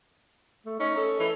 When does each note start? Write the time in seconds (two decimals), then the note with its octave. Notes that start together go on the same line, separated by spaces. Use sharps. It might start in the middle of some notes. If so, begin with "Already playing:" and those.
0.66 A3
0.80 C#4 D#4
0.97 A4
1.19 E3 A4